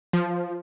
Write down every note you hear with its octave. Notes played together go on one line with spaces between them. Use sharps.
F3